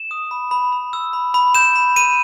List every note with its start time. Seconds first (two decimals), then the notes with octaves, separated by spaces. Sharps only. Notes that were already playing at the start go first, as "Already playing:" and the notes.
Already playing: E7
0.11 D#6
0.31 B5
0.51 B5
0.72 B5
0.93 E6
1.13 B5
1.34 B5
1.55 G6 E7
1.76 B5
1.96 B5 D#7